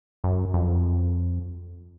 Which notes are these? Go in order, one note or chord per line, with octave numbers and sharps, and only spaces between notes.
F#2
F2